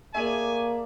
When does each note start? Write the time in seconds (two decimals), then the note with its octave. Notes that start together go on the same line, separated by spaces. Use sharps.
0.15 A3 A#3 G#4 D5 E5 G#5